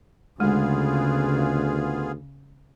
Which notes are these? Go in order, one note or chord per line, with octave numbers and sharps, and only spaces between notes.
D2 C#3 G#3 B3 F4 G#4